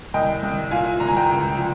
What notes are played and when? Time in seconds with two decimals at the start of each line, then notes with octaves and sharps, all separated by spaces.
0.14 C2 D#5 G5
0.43 C2
0.71 A#2 F5 G#5
1.00 C2 A#5
1.08 G#5
1.17 G5 A#5
1.29 C#2
1.57 F3